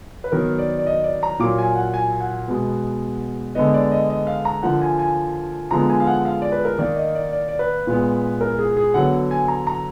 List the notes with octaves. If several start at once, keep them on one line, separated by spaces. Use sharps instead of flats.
B4
D#3 F#3 B3 A#4
D5
D5
D#5
D5
A#5
A#2 F#3 A#3 D6
G#5
F#5
G#5
F#5
B2 G#3 B3
D3 G#3 B3 D#5
D5
D#5
D#5
F5
A#5
D3 F3 A#3 F#5
G#5
G#5
D3 F3 G#3 B3 A#5
G#5
F5
F#5
F5
D5
B4
A#4
D#3 A#3 D5
D#5
D5
D5
D5
B4
A#2 G#3 B3
A#4
G#4
G#4
D3 F#3 B3 F#5
G#5
A#5
A#5